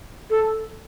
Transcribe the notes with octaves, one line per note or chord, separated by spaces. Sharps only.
A4